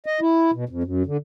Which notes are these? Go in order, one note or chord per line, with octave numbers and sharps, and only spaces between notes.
D#5
E4
B2
F2
F#2
D3